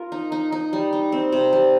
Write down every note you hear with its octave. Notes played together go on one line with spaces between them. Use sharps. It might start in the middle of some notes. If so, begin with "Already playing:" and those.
Already playing: F4 A#4
D#4
D#4
D#4
G3
D#4
C4
C3
G3